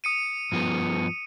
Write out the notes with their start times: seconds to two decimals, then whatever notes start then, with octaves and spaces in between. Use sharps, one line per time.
0.04 D#6 C#7 D#7
0.52 G2 F3 B3